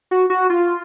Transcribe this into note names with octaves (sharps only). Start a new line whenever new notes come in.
F#4
F#4
F4